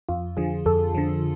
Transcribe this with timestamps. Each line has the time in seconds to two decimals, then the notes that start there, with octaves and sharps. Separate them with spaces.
0.09 F2 F4
0.37 D3 F3 G#4
0.66 F2 A4
0.95 D3 F3